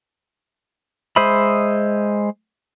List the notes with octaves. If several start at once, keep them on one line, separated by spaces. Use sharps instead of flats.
G#3 C5 D#5 E5 B5